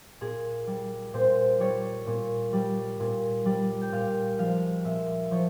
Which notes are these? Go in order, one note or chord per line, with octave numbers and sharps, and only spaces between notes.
A#2 G#4
G3
A#2 C5
G3 C#5
A#2
G3
A#2
G3
G5
A#2 F5
F3 G#3 F5
A#2 E5
F3 C#5